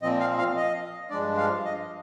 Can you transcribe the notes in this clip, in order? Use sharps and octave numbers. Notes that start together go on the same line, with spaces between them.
A#2 F3 C4 D#5
F5
F5
D#5
G2 F3 G#3 D4 D5
F5
D#5